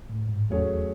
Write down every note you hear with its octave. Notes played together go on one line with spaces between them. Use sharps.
A2
G#2
E2 F#3 A3 C#4 G#4 C#5